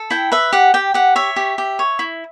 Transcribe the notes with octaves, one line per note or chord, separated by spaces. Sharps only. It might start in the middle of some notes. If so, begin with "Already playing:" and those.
Already playing: A4
E4 G5
B4 E5
G4 F#5
G4 G5
G4 F#5
C#5 E5
G4
G4
C#5
E4